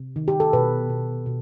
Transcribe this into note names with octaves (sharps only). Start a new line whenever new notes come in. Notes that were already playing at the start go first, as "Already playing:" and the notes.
Already playing: C3
D#3
G4
A4
B2 B4
B2
B2